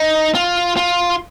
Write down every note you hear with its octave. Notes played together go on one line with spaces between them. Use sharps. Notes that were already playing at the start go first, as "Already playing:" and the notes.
Already playing: D#4
F4
F4